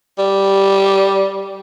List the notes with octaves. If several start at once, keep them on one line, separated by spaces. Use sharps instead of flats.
G3